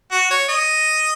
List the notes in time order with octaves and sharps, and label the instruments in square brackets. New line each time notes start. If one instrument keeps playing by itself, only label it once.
[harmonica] F#4
C#5
D#5